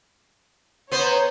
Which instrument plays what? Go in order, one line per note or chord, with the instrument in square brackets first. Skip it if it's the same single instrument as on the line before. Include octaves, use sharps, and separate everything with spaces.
[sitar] B3 C5 [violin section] C#5 A#5